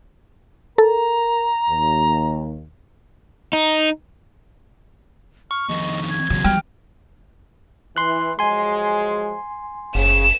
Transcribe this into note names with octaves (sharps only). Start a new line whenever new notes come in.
A4 A#4 A#5
D#2
D#4
C#6 F6
F2 D#3 D#5
G#6
E2 C#3 F#3
G3 G5 F6
E3 C6 F#6
F3 F#3 G#3 G#5 C6
F#1 C#3 E7